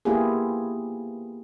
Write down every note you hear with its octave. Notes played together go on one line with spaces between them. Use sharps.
A#3 B3 E4 F4 G4 G#4